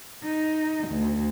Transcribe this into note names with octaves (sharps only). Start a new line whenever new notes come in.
D#4
D2